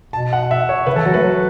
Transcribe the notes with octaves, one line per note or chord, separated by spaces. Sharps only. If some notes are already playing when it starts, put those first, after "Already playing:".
B2 A5
F#5
E5
C#5
C#3 B4
E3 A4
F#3 F#4
A3 B4
F#3